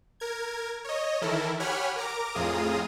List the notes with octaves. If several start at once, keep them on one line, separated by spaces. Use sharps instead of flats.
A#4 G#6
C#5 D#5
D#3 E3 E4 A4 A#4
G4 C#5 F#5 G#5 B5 F6
A#4 A#5 D6
F2 A2 F4 G#4 A#5 D#6